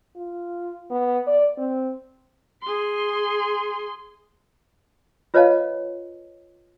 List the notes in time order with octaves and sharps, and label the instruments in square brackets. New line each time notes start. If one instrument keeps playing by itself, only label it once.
[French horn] F4
B3
D5
C4
[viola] G#4 C6
[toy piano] F4 B4 C#5 D#5 F5 A5